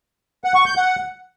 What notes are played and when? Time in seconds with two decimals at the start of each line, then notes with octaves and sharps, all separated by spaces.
0.44 F#5
0.55 C#6
0.66 G6
0.77 F#5